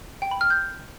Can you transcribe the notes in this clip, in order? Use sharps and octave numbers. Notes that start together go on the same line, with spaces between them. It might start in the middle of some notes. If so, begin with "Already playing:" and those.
G5
B5
F6
G6